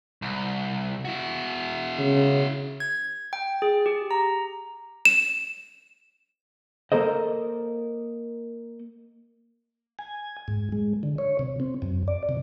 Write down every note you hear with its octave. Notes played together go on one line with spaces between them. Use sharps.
C2
E4 F#4
C#3
G#6
G5
G#4
G4
A#5
E7
A#3 A4 A#4 C5 D#5
G#5
G#2
G#3
D3
C#5
C3
C4
F#2
D5
C3